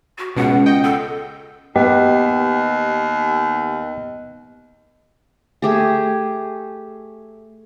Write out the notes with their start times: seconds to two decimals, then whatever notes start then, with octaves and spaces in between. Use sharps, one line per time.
0.18 F#4
0.36 C#2 B2 F#5
0.66 D#5 G5
0.83 A4
1.76 D#2 B3 G4 D#5
5.62 A3 G4 G#4